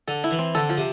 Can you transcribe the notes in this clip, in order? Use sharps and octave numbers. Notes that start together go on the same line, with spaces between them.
D3 A4
E4
E3
C4
D3 A4
F3
C3